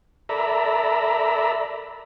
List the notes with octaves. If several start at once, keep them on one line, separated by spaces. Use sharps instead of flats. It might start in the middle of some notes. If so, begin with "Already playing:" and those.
A4 A#4 D5 E5 A#5 B5